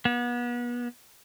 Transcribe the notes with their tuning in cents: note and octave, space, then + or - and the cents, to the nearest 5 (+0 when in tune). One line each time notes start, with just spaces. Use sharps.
B3 -35